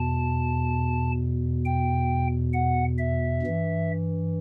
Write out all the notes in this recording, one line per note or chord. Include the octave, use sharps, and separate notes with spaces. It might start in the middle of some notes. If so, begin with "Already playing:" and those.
Already playing: E2 B2 A5
G5
F#5
E5
G2 E3